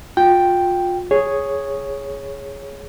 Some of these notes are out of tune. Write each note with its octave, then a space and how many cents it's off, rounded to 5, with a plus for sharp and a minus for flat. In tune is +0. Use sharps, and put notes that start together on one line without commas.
F4 +30 G5 +0
G#4 +0 C#5 +0